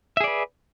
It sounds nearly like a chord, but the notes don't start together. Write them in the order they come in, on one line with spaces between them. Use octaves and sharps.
E5 G#4 D5 B4